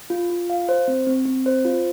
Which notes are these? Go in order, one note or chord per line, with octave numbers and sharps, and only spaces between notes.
F4
F4
F5
C5
C4
C4
C4
C5
F4